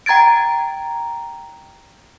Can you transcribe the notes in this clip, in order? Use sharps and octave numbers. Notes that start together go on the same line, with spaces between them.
G5 A#5 G#6 A6 D7